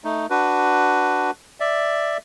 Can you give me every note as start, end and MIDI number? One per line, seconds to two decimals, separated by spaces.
0.04 0.26 57
0.04 0.26 63
0.30 1.31 62
0.30 1.31 66
0.30 1.31 71
1.60 2.17 74
1.60 2.17 76